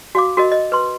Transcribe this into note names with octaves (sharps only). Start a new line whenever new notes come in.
F#4 F5 D6
F#4 A#4 D#5
D#5
B4 C6